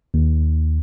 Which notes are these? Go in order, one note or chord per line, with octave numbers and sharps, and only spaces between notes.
D#2